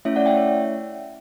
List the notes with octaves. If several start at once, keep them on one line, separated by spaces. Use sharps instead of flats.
A3 C#4 E4 C#5 E5
D5 F#5
E5 G5
C#5 E5